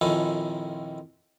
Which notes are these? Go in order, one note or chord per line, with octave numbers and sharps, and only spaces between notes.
A#1 F2 D#3 C#4 E4 A4